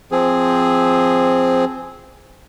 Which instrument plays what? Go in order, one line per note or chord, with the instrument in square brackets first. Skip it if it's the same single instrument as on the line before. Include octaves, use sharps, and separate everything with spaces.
[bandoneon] F3 C4 G#4